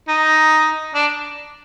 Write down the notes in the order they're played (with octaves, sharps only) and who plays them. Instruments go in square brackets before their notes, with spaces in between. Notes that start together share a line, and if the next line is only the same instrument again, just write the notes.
[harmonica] D#4
D4